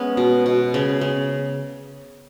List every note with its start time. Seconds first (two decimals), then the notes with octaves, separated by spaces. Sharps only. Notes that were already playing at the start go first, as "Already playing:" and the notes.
Already playing: G#3 B3 C#4
0.17 B2
0.46 B2
0.74 C#3
1.01 C#3